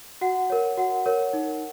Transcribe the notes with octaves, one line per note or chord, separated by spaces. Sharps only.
F#4 F#5
A#4 C#5
F#4 F#5
A#4 C#5
D#4